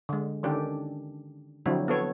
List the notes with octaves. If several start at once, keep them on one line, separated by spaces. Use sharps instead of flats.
D3 G#3
D3 D#3 C#4 D4 G4 A4
D3 F3 F#3 C4 D4 E4
B3 A4 C#5